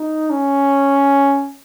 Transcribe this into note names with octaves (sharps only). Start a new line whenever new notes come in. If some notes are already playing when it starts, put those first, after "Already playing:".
Already playing: D#4
C#4